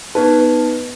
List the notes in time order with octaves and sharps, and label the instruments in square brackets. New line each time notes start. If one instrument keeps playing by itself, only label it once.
[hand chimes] B3 D#4 A5 [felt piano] B4